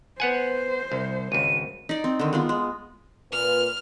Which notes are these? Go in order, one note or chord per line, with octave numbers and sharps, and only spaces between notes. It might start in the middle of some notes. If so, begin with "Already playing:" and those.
B3 C5 F#5 G#5
C2
G#1 C#2 D#7
D#4 D5
C4
D3 D#3
G#3 B3 F4
G#3
A#2 B4 F6